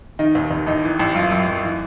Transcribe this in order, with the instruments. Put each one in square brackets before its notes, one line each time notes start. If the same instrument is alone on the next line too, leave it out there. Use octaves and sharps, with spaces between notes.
[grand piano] D#3 D#4
D#2
D#2
A1 D#4
E3
A1
F#2 F4
F#2
F#2
E3